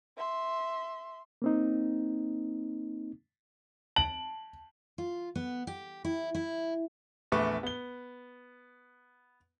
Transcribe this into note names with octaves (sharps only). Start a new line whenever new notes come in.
E5 C6
A#3 C4 D#4
A5 F#7
F4
B3
G4
E4
E4
A#1 E2 A3 B4 C#6 D6
B3 G7